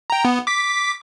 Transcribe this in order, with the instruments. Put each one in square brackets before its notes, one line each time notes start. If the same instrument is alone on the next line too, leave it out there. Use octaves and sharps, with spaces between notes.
[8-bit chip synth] G5 A#5
B3
D6 B6